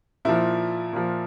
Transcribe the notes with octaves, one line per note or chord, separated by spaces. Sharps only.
A#2 F3 E4
A#2 F3